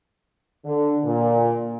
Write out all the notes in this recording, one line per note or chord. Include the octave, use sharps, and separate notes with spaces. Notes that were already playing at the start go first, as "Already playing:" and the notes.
D3
A#2